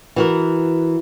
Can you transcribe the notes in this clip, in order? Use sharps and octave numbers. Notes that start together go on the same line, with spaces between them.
E3 F#4 A#4